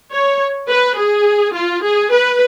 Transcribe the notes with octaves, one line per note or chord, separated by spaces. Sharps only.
C#5
B4
G#4
F4
G#4
B4